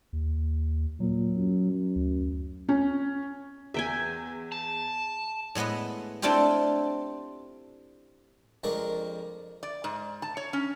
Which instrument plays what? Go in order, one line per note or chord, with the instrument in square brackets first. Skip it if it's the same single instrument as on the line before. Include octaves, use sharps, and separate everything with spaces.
[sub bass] D#2
[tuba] A#2 [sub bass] F#3
[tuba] F#2
[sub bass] D2
[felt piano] C#4
[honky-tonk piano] E2 [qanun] E5 G5 G#5
[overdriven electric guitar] A5
[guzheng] A2 G#3 B3 B4 D#5
A3 C4 D4 E4 F4 G4
[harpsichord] F2 G#3 D4 A#4 A5 C#6
[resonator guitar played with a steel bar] D5
G#2
A5
C#5
C#4